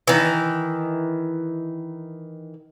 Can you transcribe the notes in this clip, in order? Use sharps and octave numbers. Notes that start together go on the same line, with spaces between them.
D#3 E3